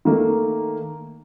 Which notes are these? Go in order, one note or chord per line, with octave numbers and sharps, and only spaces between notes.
D#3 A3 A#3